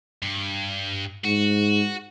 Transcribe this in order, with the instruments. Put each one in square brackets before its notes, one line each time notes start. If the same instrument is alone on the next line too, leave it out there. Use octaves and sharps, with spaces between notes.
[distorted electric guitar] G2
[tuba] G#2 [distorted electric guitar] F#4